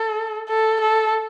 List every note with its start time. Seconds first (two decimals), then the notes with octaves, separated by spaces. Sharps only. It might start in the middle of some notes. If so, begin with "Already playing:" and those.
Already playing: A4
0.49 A4
0.81 A4